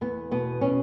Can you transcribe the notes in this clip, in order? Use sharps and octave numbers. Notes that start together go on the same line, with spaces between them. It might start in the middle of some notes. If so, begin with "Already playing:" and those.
E2 B3
B2 B3
B2 C#4